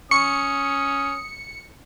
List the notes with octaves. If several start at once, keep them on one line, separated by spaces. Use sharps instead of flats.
C#4 C#6 D#6 C#7